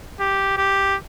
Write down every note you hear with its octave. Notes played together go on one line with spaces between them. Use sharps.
G4
G4